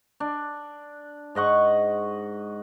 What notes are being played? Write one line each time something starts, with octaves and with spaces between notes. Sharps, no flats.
D4
G#2 D#5 F#5 C#6